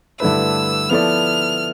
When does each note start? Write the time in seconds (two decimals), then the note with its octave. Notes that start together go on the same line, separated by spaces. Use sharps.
0.20 G2 D3 A3 E4 B4 E6
0.90 F3 B3 E4 A4 D5 F6